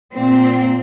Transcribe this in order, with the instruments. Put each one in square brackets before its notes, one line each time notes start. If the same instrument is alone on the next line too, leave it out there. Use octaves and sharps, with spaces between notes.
[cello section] A#2 C4